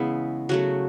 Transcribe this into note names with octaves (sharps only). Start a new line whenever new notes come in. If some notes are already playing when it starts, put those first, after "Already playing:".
Already playing: C#3 E3 G#3 B3 E4
C#3 F#3 A3 F#4